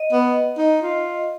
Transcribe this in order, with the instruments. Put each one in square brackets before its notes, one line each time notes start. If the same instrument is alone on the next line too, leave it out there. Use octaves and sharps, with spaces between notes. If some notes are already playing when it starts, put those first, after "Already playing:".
Already playing: [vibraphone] D#5
[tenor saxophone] B3
D#4
F4